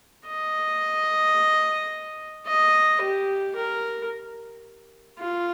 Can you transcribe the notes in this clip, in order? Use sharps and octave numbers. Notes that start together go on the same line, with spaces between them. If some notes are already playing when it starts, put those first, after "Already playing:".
D#5
D#5
G4
A#4
F4